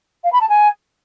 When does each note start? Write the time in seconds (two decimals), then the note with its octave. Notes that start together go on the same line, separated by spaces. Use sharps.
0.24 F5
0.32 B5
0.41 A5
0.49 G#5